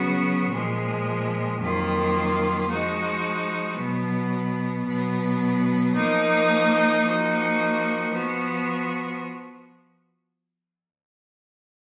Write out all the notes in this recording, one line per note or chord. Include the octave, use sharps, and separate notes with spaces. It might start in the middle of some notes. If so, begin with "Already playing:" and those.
Already playing: C#3 F#3 B3 F#4
A#2 F3 G#3
F2 D#3 F#3 A#3 F4
F3 G#3 D#4 F#4
B2 F#3 B3
B2 F#3 B3
F3 A#3 D#4
F3 A#3 D#4 F#4
F3 B3 F#4